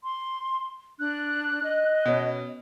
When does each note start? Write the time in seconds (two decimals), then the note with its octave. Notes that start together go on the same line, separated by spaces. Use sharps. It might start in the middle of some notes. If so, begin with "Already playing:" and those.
0.04 C6
0.99 D4 F#6
1.63 D#5
2.05 B2 C#4